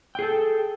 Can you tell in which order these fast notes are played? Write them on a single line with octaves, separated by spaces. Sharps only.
G5 G#4 A4